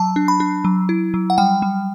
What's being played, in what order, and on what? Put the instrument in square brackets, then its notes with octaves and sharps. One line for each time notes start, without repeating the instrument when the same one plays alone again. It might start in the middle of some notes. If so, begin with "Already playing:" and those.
Already playing: [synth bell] F#3 A5
D4
B5
D4
F#3
E4
F#3
F#5
G3 G5
G3